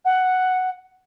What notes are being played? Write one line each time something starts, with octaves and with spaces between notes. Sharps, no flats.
F#5